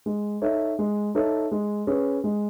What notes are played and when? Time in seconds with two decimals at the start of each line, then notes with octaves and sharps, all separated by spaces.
0.06 G#3
0.42 D#4 A4 C#5 E5
0.79 G#3
1.15 D#4 A4 C#5 E5
1.51 G#3
1.87 C#4 G#4 B4
2.24 G#3